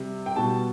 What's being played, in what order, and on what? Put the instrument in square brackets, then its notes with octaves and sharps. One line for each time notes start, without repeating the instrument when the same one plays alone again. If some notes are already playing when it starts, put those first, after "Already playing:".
Already playing: [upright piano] C3 G3
G5
B2 G3 A5